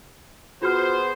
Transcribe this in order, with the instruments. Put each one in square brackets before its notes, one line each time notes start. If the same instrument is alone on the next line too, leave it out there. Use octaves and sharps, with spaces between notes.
[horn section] B3 G#4 C5 [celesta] F4 F#4 F6